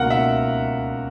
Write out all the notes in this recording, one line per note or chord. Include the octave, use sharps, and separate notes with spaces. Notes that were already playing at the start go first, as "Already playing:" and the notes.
Already playing: C#2 B2 A#3 A#4 F#5
E5